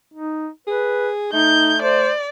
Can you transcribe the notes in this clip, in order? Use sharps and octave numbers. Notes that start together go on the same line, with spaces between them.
D#4
G#4 B4
A3 D#4 G6
C5 D5